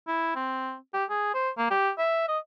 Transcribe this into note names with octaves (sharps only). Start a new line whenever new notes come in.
E4
C4
G4
G#4
C5
A#3
G4
E5
D#5